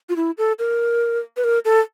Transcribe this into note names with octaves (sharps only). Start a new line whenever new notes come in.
F4
E4
A4
A#4
B4
A#4
A4